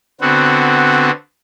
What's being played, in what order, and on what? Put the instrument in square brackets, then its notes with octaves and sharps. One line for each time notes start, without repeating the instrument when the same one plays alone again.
[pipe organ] D3 B3 C4 F#4